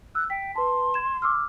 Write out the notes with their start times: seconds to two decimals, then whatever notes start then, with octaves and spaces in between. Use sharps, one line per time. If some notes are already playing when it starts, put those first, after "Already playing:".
0.15 E6 F#6
0.30 G5 B6
0.55 B4 A5 C6
0.94 G#6 E7
1.22 D6 E6 F6